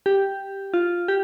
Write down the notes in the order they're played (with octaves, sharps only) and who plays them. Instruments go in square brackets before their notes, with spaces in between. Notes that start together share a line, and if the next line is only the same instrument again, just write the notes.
[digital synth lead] G4
F4
G4